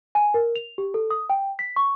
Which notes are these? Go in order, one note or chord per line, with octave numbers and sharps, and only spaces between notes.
G#5
A#4
F7
G4
A4
D#6
G5
B6
C#6